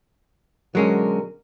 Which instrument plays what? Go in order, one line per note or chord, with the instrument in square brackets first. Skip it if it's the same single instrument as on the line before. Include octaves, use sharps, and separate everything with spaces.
[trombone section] B2 D3 A#4 [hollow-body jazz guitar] F#3 G#3 C#4